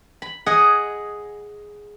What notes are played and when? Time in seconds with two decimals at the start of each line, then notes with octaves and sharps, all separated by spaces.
0.22 B5
0.46 G#4 D#5 F#5